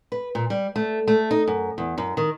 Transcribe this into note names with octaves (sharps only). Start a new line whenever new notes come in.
B4
A#2
G3
A3
A3
D#4
F#2
E2
F#2
D#3